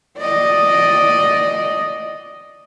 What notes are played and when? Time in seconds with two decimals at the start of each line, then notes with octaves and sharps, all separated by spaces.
0.18 D5 D#5